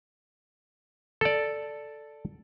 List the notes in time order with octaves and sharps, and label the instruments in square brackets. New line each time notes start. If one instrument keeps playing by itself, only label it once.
[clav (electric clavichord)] A4 D5